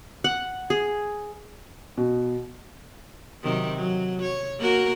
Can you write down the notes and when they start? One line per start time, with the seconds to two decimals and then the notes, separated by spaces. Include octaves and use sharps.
0.24 F#5
0.70 G#4
1.98 B2
3.43 C3 D#3 F#3
3.75 F#3
4.22 C#5
4.59 A#3 F#4 A#4